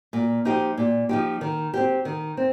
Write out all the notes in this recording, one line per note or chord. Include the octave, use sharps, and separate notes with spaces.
A#2
F3 D#4 G4
A#2
F3 D#4 G4
D#3
C4 G4
D#3
C4